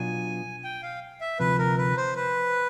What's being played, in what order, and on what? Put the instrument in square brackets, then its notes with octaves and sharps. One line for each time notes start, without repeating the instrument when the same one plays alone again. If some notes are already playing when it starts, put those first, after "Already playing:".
Already playing: [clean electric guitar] B2 F#3 B3 D4 F4 [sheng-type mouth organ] G#5
[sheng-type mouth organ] G5
F5
E5
[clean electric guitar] D2 C3 F3 [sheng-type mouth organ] B4
[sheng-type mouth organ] A#4
B4
C5
B4